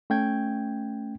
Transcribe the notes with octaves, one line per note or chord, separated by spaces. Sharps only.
A3 C#4 G5 G6 G#6